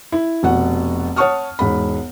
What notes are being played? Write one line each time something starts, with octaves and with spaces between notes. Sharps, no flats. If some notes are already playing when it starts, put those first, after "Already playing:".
E4
F1 B2 F#5
C#5 F#5 A5 C#6 D#6 F6
E1 G#2 B5